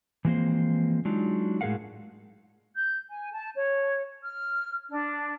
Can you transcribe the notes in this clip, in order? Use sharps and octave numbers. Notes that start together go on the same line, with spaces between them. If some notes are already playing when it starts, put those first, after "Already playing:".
E3 F3 G#3 A#3 C4 C5
F#3 G#3 D4 D#4 F4
A2 G#3 G#4 A#4 F5 F#5
G6
G#5
A5
C#5
F6
D4